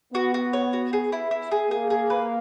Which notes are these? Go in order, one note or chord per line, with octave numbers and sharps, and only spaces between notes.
B3 F#4
F#4
C#5
F#4
G#4
E4
E4
G#4
A#3 G#4
G#4
B4